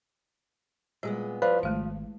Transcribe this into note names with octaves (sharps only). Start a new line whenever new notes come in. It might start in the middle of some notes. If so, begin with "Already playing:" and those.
A#2 G3 G#3 B3
F3 B4 D5 F5
G#1 G#3 A3 F5